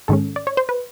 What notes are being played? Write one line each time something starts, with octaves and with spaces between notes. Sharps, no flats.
G#2 D#3 G#3 C#4 A4
D5
C#5
C5
B4